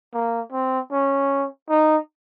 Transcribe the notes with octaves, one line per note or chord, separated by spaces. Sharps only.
A#3
C4
C#4
D#4